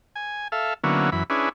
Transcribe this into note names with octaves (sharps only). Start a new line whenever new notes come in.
G#5
A4 E5 F5
D3 F#3 A#3 B3 C#4 E4
F#2 E3 B5
C#4 D4 E4 G#4 B4